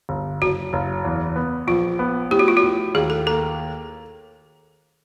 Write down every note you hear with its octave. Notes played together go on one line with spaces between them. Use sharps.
G1
F#1 F#4
F#1
E2
B3
A#1 F4
B3
A2 G4
F#4
F4
F#4
A2
D#2 G#4
A4
A#3 A4